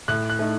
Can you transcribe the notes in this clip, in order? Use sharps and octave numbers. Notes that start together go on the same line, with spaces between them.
A2 F#6
F#6
A3 D#4